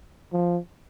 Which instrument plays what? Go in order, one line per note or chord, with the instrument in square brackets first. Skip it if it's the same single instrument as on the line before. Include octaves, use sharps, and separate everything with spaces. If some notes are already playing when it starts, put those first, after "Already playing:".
[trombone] F3